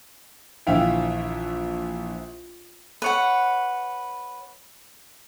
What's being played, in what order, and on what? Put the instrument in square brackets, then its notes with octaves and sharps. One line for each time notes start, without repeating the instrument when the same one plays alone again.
[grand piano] A#1 D3 E3 E5 F5 G5
[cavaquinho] B4 C#5 F#5